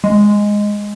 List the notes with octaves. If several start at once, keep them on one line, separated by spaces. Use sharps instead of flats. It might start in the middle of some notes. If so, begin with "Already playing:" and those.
G#3